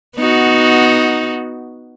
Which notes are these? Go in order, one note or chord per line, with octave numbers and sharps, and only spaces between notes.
B3 D#4 F#4